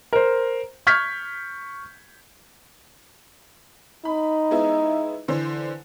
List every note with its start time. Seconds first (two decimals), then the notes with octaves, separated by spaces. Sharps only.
0.13 A#4 C5
0.87 C#6 F6 G6 G#6 B6
4.05 D#4 B5
4.51 G#3 B3 E4
5.28 D3 E3 C5